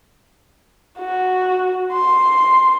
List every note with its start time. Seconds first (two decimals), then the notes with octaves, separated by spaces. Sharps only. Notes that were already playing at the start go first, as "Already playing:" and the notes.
0.99 F#4
1.93 C6